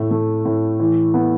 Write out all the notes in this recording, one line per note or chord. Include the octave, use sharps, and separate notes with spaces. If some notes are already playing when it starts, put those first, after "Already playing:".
Already playing: A2 A3
A3
A2
E3
B3